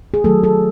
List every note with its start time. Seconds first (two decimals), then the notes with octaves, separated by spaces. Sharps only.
0.14 G#4
0.24 D#3 F#3 A3 A4
0.44 A4